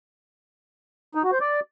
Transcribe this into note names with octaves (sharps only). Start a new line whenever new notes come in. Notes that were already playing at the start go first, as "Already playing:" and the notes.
D#4
F#4
C5
D5